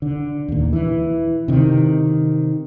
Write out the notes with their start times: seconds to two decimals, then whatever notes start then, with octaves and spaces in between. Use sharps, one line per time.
0.02 D3
0.48 D#2 A#2
0.73 E3
1.48 C3 D#3